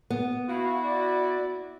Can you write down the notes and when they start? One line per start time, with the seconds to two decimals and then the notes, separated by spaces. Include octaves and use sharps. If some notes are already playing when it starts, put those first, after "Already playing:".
0.10 B3
0.48 E4 F#4 F5
0.83 D5